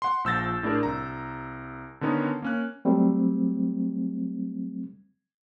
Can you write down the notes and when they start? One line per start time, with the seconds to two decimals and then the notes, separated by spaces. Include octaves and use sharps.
0.02 F#5 C6
0.24 A#1 F3 E6 G6 A6 A#6
0.63 A2 D4 G#4 A#4 D5
0.83 C2 A#5
2.01 D3 D#3 B3 C#4 D#4
2.42 A#3 C#4 F#6
2.85 F#3 G3 A3 C4